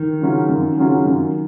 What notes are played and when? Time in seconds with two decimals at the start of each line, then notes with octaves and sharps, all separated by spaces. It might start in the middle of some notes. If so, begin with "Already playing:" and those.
Already playing: D#3
0.21 C#3 F#3 C#4 F4
0.49 F#2
0.77 C#3 F#3 C#4 F4
1.06 F#2